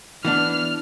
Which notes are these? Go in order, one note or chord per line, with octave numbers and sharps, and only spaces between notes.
E3 B3 D4 F6